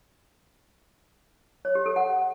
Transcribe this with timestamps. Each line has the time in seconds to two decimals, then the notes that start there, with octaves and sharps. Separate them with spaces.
1.65 C#5
1.75 G4
1.86 A4
1.96 F#5